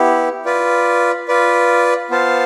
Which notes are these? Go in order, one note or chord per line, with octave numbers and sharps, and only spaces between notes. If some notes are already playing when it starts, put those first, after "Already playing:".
Already playing: B3 E4 G4
F4 B4 D5
F4 B4 D5
B3 F4 C5 F5 A5